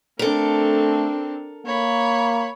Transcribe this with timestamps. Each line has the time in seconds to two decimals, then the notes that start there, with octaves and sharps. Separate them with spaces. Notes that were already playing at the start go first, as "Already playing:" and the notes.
0.19 A3 C4 D4 A4 A#4
1.66 A#3 C#5 B5